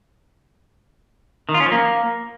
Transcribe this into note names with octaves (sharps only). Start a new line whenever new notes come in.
D#3
F4
C#4
F3
A#3